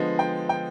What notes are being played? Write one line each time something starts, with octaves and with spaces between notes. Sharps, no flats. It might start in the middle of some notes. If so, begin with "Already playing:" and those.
Already playing: D3 F3 G#3 B3
G5
G5